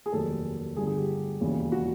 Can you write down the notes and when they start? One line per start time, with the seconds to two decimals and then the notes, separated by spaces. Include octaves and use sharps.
0.06 G#4
0.13 F1 D#2 D#3 F#3 A4
0.76 G1 G2 D3 G3 G#4
0.87 G#4
0.97 G4
1.41 E1 D#2 C#3 E3
1.72 F#4